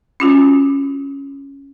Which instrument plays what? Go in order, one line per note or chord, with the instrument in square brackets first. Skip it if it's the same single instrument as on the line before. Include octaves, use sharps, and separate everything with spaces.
[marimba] C#4 F4 F#4